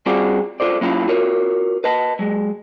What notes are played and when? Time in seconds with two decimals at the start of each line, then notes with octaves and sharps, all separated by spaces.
0.06 G3 C4 F4 F#4 G#4 D5
0.60 F4 A4 C5 D5
0.81 F#3 A#3 C#4 E4 F4
1.08 F4 F#4 A#4 C#5
1.84 B4 D#5 A5
2.19 F#3 G#3